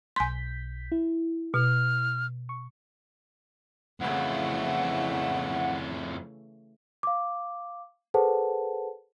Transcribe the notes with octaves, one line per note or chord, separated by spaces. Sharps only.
B1 G#5 C6 G6 B6
E4
B2 F6
C#6
F2 C#3 E3 A3 E4 F#5
F5 D6
G#4 A4 B4 C5 F#5 A5